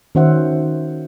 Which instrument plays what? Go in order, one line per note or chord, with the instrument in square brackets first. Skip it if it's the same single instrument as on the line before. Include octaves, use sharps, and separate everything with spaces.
[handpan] D#3 C#4 F#4 C5 E5 F#5